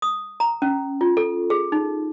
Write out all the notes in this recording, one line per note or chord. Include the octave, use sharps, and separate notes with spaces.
D#6
A#5
C#4
F4
A4
G#4
D#4